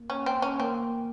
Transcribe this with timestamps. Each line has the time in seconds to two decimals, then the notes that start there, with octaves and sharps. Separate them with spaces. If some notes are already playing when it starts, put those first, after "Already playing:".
Already playing: A#3
0.10 C#4
0.26 C4
0.42 C#4
0.60 A#3 C4